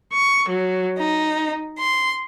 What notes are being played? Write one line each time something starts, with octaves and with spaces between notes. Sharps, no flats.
C#6
F#3
D#4
C6